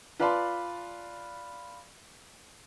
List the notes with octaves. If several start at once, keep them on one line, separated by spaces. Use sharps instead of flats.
F4 B4 D5 A5 B5 C6